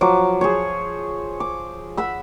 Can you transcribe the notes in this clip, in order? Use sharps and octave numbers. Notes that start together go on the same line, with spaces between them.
F3 F#3 D6
G#4 C5 C#5
D6
E5 F#5 B5 E6